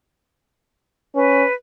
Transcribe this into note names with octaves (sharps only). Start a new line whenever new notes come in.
C#4 B4